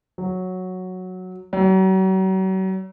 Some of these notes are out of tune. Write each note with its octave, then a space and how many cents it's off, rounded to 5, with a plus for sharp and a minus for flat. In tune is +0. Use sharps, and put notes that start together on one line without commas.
F#3 -5
F#3 +40